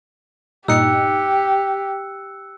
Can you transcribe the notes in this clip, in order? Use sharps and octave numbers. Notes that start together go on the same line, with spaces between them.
G2 A#2 D#4 G4 E6 F#6 C#7